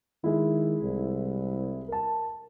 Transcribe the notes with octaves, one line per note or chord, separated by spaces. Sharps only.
D#3 G#3 E4
C2
A#4 A5